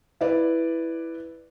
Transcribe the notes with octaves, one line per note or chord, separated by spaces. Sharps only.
E4 B4 D5